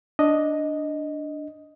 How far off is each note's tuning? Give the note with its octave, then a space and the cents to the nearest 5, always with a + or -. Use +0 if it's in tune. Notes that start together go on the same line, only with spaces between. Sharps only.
D4 +0 D#5 +0